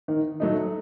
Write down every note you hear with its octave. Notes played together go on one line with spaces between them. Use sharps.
D#3
F#3 A3 D#4